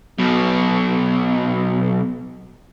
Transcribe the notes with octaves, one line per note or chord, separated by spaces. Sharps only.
B1 B2